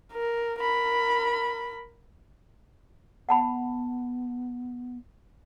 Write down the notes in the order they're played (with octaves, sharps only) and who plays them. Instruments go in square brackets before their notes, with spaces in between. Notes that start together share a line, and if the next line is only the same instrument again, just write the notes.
[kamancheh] A#4
A#4 B5
[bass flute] B3 [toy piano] F#5 A5 B5